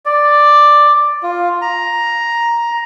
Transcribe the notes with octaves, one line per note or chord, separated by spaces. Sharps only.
D5
F4
A#5